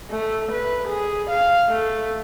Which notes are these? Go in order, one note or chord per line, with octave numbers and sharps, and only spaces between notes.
A3
B4
G#4
F5
A3